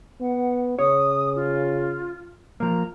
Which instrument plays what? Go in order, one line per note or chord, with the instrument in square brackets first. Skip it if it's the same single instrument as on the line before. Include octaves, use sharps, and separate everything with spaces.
[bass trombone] B3 [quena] F#5
[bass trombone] C#3 [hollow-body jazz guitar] C#5 [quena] D#6
[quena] F4
[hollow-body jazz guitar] F3 A#3 [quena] A#5